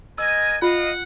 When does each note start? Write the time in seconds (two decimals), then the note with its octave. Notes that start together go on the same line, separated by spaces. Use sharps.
0.18 A#4 D#5 G#5 E6
0.62 F4 D#5 F5 F#5